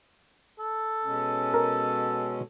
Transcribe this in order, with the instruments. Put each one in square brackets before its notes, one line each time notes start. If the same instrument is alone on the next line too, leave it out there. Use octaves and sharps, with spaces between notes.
[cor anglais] A4
[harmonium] B2 G#3 C#4
[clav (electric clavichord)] A#4